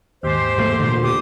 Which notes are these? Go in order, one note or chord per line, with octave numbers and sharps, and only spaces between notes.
D#2 G#2 G4 C5
E1 A3 A#3
A#2 D3
G4 D#6